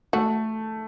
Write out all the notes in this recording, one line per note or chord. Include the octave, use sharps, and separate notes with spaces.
A3 F#4